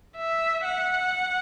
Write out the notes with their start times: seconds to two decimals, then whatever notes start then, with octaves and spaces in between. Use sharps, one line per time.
0.17 E5
0.65 F#5